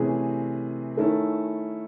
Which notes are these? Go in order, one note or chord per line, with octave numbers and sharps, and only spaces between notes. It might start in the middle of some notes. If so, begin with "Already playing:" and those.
Already playing: C3 E3 A3 C#4 G#4
D#3 A3 C#4 E4 A4